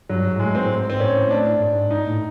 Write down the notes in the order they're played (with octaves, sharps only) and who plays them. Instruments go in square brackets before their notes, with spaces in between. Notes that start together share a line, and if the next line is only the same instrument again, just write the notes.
[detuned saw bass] G2 [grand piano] F#3
[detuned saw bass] G#2
[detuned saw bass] A2 [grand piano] G#3
[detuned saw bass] G#2 [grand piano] C4
[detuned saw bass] A2
G#2
[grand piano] C4
[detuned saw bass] A2 [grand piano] C#4
[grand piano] D4
[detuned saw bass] G#2
[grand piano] D#4
[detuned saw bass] A2